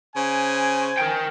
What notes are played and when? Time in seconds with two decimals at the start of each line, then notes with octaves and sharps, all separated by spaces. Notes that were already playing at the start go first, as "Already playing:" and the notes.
0.16 C#3 C5 G#5
0.99 A#4 G5